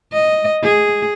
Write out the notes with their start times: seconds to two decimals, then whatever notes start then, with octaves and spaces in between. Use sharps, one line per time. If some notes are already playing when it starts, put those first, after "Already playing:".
0.12 D#5
0.63 G#4